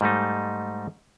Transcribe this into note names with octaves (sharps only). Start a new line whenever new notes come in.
G#2 G3 A3 D#4